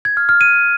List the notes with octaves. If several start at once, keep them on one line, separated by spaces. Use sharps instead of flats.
G#6
F6
F6
D#7